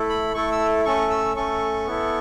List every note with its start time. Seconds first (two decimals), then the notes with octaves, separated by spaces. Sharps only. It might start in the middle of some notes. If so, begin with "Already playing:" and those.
Already playing: A3 E4 A4
0.09 B5
0.34 A3 E4 A4 C#6
0.52 E6
0.85 A3 C#4 A4 C#6
1.10 E6
1.36 A3 C#4 A4 C#6
1.86 B3 E4 A4